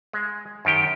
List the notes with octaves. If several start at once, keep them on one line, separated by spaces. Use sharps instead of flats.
G#3
F#2 D#3 G4 G5